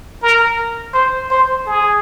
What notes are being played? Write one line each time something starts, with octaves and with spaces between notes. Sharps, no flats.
A#4
C5
C5
G#4